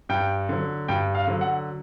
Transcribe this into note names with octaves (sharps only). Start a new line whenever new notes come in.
G2 G5
D3 F#3
G2 G5
F5
D3 F#3
F#5